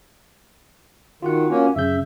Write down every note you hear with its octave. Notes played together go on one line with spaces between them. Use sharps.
D#3 F4 F#4 F#5
A#3 C#4
F#2 C#3 E5 G6